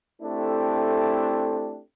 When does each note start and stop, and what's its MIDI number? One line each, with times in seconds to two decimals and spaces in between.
0.22 1.81 57
0.22 1.81 60
0.22 1.81 62
0.22 1.81 64
0.22 1.81 67
0.22 1.81 69